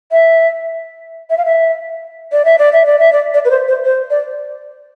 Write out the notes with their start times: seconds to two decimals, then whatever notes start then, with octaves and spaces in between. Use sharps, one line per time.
0.12 E5
1.30 E5
1.38 F5
1.45 E5
2.32 D5
2.45 E5
2.58 D5
2.73 E5
2.86 D5
2.99 E5
3.13 D5
3.34 D5
3.45 B4
3.50 C5
3.68 C5
3.85 C5
4.10 D5